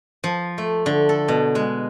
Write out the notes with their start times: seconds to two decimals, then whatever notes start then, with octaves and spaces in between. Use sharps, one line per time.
0.24 F3
0.58 A3
0.86 D3
1.09 A4
1.28 B2
1.55 G#3